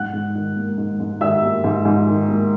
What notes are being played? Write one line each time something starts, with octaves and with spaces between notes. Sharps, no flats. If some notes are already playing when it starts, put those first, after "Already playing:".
Already playing: G#2 F#5 F#6
G#2
D#3
A#3
G#2
G#2
D#3 E5 E6
A#3
G#2
G#2
D#3
A#3